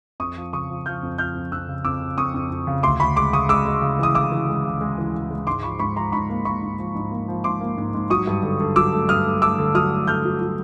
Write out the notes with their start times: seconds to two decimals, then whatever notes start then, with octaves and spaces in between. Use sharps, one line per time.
0.20 F2 C#6 D#6
0.37 F3
0.53 C#3 C#6 D#6
0.70 F3
0.86 F3 F6 G6
1.03 F2
1.18 F3 F6 G6
1.35 F2
1.52 F2 E6 F#6
1.68 C#3
1.85 F2 D6 E6
2.01 C#3
2.18 F2 C#6 D#6
2.34 F2
2.50 F2
2.67 C#3
2.83 D2 C6 D6
3.00 D2 B5 C#6
3.16 G#3 C6 D6
3.33 C#3 C#6 D#6
3.49 G#3 D6 E6
3.66 G#3
3.82 C#3
3.99 E3 D#6
4.15 C#3 D6 E6
4.32 E3
4.48 G#3
4.65 C#3
4.81 G#3
4.98 E3
5.14 C#3
5.31 G#3
5.47 G#2 C6 D6
5.63 F3 B5 C#6
5.79 G#2 B5 C#6
5.96 F3 A#5 C6
6.12 G#2 B5 C#6
6.29 A#3
6.45 A#3 B5 C#6
6.63 G#2
6.79 F3
6.95 G#2
7.11 A#3
7.28 F3
7.44 G#2 C6 D6
7.61 A#3
7.77 G#2
7.94 G#2
8.10 F#3 C#6 D#6
8.27 G2
8.43 D3
8.60 D3
8.76 F#3 D6 E6
8.93 A3
9.09 G2 D#6 F6
9.25 A3
9.42 A3 D6 E6
9.58 D3
9.75 F#3 D#6 F6
9.92 A3
10.07 D3 F6 G6
10.25 F#3
10.41 F#3